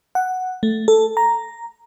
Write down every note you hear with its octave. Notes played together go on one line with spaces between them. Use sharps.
F#5
A3
A4
A#5